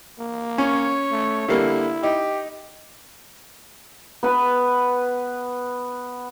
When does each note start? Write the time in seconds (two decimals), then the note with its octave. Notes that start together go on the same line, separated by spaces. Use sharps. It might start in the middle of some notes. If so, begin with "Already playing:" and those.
0.19 A#3
0.58 C#4 C#5
1.11 A3
1.48 D3 G3 A#3 E4
2.03 D#4 G4
4.23 B3 B4